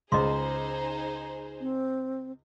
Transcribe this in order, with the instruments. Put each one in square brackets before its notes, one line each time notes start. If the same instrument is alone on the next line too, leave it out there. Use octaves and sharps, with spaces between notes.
[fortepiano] C#2 [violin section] D#4 G#4 C5 [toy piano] D#5 C6 [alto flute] A#5
[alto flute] C4